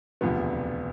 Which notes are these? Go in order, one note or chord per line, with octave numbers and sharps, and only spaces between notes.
E1 D2 C3 F3 B3